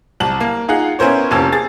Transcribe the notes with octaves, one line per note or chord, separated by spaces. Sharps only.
C2 A5 F#7
A#3
D#4 F4 G#4 F#5
B3 C#4 E4 A#4 C5 C#5
F1 C3 A#3 C#4 A5 E6
G#4 A6